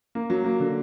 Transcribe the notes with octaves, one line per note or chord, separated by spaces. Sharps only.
A#3
F#3
A#3
D3